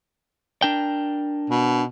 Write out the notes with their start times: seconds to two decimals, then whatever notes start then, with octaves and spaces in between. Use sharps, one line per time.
0.62 D4 A#4 G5
1.50 B2